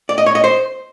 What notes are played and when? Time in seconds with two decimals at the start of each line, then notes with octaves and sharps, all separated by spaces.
0.09 D5
0.18 D#5
0.26 C#5
0.35 D#5
0.44 C5